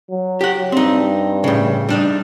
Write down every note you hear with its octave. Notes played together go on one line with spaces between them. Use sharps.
F#3
G4 F#5
G2 C4 D#4
A2 C#3
G3 D4 D#4